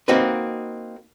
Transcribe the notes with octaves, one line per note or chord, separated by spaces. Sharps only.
A#3 C4 D#4 F#4 B4